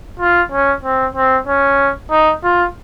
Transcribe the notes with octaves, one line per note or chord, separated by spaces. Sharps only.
F4
C#4
C4
C4
C#4
D#4
F4